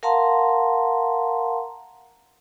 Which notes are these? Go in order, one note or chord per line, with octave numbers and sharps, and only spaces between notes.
A#4 F5 F#5 A5 A#5 C6